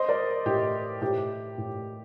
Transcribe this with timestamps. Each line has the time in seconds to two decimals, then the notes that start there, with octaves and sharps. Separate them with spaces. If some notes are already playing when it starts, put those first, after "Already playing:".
Already playing: C5 D#5
0.09 A#4 D5
0.46 A2 G4
1.02 A2 G4
1.58 A2